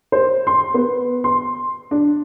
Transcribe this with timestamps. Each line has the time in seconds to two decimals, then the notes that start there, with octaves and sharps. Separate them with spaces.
0.12 C5
0.47 C6
0.74 B3
1.24 C6
1.91 D4